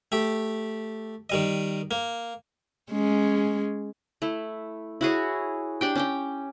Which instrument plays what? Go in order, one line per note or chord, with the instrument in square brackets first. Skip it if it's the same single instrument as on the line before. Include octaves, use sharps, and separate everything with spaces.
[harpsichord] A3 G4
D#3 G3 D#5
A#3
[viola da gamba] G#3 C#4
[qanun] A3 E4
E4 F#4 G#4 C#5
D4 G4 G5
C#4 G4 G5